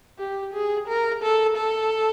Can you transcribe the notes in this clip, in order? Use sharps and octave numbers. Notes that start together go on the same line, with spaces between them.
G4
G#4
A#4
A4
A4